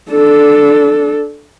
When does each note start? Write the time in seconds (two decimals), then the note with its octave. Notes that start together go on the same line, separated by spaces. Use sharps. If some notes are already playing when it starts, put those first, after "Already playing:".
0.11 D4 A4